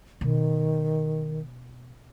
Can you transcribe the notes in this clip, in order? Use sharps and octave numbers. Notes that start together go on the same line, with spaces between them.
B2 D#3